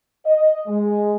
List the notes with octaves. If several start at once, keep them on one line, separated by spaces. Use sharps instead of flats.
D#5
G#3